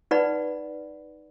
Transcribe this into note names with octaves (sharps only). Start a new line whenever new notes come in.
D#4 B4 D5 F#5 B5